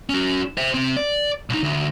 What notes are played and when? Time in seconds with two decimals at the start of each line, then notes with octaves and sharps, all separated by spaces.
0.09 C#4 F#4
0.58 C5 E5
0.74 C3 C4
0.97 D5
1.50 B1 D#4
1.63 D2